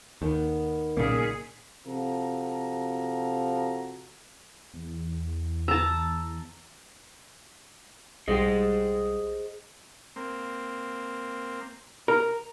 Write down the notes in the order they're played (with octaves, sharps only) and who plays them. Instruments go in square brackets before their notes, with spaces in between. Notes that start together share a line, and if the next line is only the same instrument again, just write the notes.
[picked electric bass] D#2 [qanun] D#3 B3
[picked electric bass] B1 C#3 A#3 [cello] A#2 G#4
[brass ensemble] C3 F3 F#4 A4 A#5
[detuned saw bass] E2
[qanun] A5 A#5 [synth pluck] E6
[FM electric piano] B1 G3 G4 [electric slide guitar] G#4 C5 D#5
[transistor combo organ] A#3 C4
[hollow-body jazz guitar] A#4